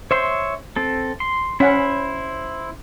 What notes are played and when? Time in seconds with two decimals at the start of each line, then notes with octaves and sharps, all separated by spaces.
0.11 C5 C#5 E5 C6
0.76 C4 A4
1.20 C6
1.60 C#4 E4 C5 F#5 B5